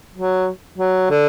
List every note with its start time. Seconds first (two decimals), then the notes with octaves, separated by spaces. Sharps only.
0.14 F#3
0.78 F#3
1.10 D3